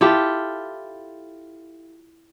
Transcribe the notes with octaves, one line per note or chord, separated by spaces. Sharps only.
E4 F4 G4 A4